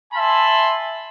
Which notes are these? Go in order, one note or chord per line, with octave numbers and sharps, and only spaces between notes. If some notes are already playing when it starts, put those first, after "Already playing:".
E5 G#5 A5 B5 C6